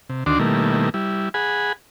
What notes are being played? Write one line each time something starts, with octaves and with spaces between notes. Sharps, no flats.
C3
D2 D#3 D4 F#4 C6 D6
B2 D#3 G3 A3 A#3 E4
G3 E4
G#4 F#5 G#5 B5